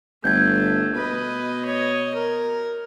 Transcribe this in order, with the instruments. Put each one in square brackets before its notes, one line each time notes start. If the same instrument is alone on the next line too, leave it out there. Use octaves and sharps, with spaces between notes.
[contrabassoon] G1 [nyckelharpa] A3 [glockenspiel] G6 G#6
[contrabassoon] B2 [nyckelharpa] B4 D#5
[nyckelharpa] C#5 D#5
A#4